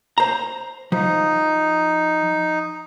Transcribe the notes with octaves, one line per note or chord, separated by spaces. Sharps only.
C5 A#5
F3 D#4